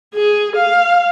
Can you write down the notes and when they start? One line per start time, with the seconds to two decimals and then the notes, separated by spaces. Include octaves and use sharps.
0.14 G#4
0.56 F5